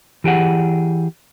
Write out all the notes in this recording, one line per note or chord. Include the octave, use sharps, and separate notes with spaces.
E3 G4 G#4 F#5